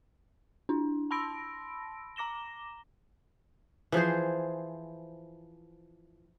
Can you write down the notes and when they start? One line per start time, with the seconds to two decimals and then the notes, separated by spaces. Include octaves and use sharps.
0.69 D4 E4
1.11 A5 B5 C6 E6 A#6 D7
2.16 A#5 D6 A#6 E7 G7
3.92 E3 F3 G#4 C5